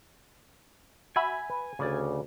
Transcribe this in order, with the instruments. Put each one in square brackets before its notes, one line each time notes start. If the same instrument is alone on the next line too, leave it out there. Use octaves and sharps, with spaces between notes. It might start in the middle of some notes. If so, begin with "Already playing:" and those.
[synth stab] F#4 E5 B5 [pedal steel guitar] G#5
[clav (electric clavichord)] B4
[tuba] D2 [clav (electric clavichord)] C#3 D5